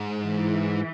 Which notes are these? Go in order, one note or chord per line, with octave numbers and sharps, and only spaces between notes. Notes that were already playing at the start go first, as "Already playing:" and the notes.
Already playing: G#2
E3